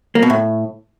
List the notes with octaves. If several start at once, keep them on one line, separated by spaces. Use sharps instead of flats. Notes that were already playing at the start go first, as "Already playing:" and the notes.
A#3
B2
A2